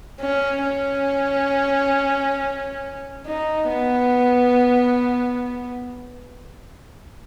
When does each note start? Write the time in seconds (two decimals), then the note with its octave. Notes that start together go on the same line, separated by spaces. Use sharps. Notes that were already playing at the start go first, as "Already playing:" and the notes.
0.20 C#4
0.65 C#4
3.26 D#4
3.70 B3